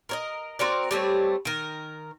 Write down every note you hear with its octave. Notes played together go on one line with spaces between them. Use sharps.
A#4 C#5 D#5
C4 F#4 A#4 D5
G3 A3 C4 C#5
D#3 A#4